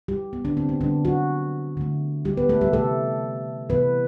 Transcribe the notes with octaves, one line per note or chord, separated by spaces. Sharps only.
G3 G4
B3
D3 D4
C4
B3
D3 D4
G3
F#3 F#4
D3 A3
G3 G4
B3 B4
A3 A4
G3 G4
C3 E3 G3 A3 A4
C3 E3 G3 B3 B4